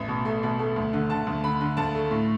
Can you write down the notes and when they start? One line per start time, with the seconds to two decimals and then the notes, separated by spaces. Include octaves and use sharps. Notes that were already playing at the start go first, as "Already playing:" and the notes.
Already playing: A1
0.08 B2
0.25 A3
0.43 B2
0.59 A3
0.76 D2
0.93 D3
1.10 D3 A5
1.27 D2
1.44 D3 B5
1.61 D3
1.77 D2 A5
1.95 A3
2.11 A2